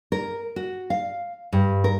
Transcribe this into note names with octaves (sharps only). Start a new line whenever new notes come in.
A#4
F#4
F5
G2
A#4